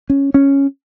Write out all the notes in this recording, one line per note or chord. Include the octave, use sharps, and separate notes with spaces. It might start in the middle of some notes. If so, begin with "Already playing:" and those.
C#4
C#4